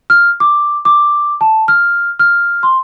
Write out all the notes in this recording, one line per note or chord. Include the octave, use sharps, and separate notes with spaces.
F6
D6
D6
A5
F6
F6
C6